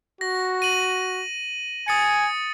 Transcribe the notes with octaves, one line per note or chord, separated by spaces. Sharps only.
F#4 A#6
D#7 F#7
G#5 D#6 A6 C#7